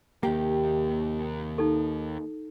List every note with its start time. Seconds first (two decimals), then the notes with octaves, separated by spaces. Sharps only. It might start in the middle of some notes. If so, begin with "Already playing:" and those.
0.23 D#2 C3 A#3 G4
1.58 D#4 A4